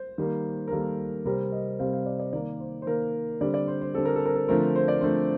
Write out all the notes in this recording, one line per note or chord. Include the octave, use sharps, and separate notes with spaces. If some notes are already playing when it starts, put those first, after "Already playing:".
Already playing: C5
D#3 G3 A#3
A#4
D#3 G3 A#3 A4
C3 G3 C4 A#4
D#5
C3 G3 C4 F5
F5
D5
D5
D#3 A#3 D5
C5
C5
D#3 A#3 A#4
D3 G3 C4 D5
D5
C5
C5
D3 G3 C4 A4
A#4
A4
A#4
A4
D3 F3 A3 C4 A#4
C5
D5
D3 F3 A3 C4 C5